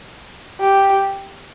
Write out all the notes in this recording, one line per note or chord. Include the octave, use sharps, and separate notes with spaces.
G4